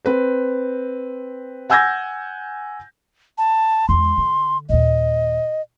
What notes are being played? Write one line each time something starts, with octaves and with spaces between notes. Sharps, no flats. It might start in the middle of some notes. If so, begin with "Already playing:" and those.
C4 B4 C5
F#5 G#5 E6 G6 G#6 A#6
A5
E2 G#3 C6
D3
D#2 A#2 D#5